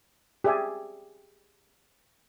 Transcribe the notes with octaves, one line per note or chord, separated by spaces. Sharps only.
G4 G#4 D5 E5 G#5